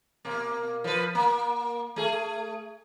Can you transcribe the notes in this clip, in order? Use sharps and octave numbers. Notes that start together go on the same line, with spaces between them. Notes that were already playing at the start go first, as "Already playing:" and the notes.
B2 A#3
F3 B4
A#3
A3 G#4